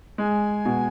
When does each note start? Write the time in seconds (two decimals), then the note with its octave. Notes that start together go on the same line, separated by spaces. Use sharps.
0.18 G#3 G#5
0.65 B2